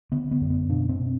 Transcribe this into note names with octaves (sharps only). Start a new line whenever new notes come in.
D3 B3
B3
F#2
B3
B2 D4
C4
B2